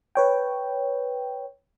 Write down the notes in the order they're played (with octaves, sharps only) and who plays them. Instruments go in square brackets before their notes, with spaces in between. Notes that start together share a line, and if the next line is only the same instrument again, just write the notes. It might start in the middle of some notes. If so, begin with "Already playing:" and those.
[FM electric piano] B4 C#5 G5